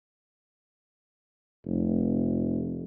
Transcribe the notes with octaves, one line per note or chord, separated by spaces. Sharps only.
F1